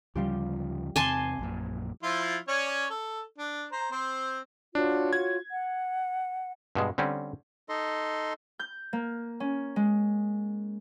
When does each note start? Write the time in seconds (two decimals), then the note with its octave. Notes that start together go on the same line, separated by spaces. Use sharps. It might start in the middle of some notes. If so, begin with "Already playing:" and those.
0.15 D2 C#3 F3 G3 F4 G4
0.96 E2 C3 C4 G#5 A5 C6 D6
1.39 A#1 F#2 A#2
2.03 F3 E4 F4
2.48 C#4 C#5 D5
2.90 A4
3.38 D4
3.72 C5 A#5
3.92 C4 C5
4.75 D4 F4 F#4 C#5
5.13 G#6
5.50 F#5
6.75 G2 B2 G#3
6.98 D3 G3 C4 C#4
7.69 D#4 A4 D#5 C6
8.59 G6
8.93 A#3
9.40 C#4
9.76 G#3